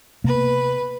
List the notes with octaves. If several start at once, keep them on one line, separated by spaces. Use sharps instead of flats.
C3 A#3 B3 B4